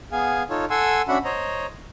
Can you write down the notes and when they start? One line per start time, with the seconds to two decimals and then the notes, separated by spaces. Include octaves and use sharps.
0.12 B3 G#4 F5 G#5
0.50 D#4 F4 A4 C#5
0.70 A4 F#5 G#5 C6 E6
1.08 C#4 D4 F#4 E5 F#5 B5
1.24 C5 C#5 D#5 A#5